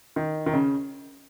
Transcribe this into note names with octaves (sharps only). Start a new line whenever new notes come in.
D#3
D#3
C#3